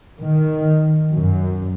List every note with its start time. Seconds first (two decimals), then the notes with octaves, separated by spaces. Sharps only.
0.19 D#3
1.13 F#2